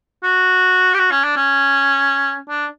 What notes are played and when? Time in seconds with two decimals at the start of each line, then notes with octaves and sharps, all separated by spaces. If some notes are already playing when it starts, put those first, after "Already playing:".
0.23 F#4
0.94 G4
0.99 F#4
1.11 C#4
1.24 D4
1.36 C#4
2.49 D4